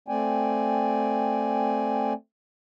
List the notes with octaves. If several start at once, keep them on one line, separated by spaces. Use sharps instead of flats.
A3 C4 D5 G5 G#5